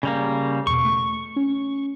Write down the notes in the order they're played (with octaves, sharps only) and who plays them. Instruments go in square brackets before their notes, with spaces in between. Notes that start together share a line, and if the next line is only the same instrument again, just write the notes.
[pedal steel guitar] C#3 G3 A#3
[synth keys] E2 B2 [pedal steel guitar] C#6
[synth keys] A3
C#4